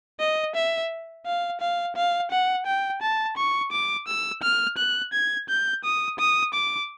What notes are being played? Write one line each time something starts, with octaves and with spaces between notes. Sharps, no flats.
D#5
E5
F5
F5
F5
F#5
G5
A5
C#6
D6
E6
F6
F#6
G#6
G6
D#6
D#6
D6